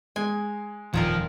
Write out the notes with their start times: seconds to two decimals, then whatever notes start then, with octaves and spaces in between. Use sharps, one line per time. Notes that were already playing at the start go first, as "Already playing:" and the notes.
0.16 G#3 G#5
0.94 D#1 F2 A#2 D#3 F3 A#4